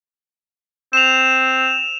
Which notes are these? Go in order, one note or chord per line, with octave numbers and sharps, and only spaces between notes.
C4 E7 F7